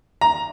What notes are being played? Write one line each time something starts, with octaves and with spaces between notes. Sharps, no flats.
A#5